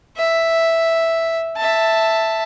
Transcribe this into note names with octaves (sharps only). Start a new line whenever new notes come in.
E5
E5 A5